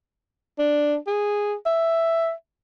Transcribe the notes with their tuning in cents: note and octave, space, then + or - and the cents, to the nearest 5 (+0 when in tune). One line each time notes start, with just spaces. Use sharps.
D4 +5
G#4 -10
E5 +5